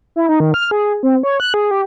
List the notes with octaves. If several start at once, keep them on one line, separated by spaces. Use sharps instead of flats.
E4
D#4
D#3
F6
G#4
C4
C#5
F#6
G#4
G4